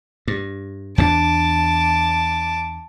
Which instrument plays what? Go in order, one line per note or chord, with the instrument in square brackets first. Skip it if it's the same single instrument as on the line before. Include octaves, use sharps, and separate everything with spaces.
[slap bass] G2
[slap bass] E2 A3 D4 [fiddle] A5 D6